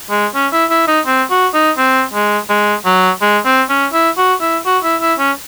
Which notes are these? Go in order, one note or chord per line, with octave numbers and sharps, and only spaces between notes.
G#3
C#4
E4
E4
D#4
C4
F#4
D#4
C4
G#3
G#3
F#3
G#3
C4
C#4
E4
F#4
E4
F#4
E4
E4
C#4